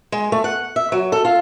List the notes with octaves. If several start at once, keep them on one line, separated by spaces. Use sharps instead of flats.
G#3
A3
F#5
E5
F#3
A4
F4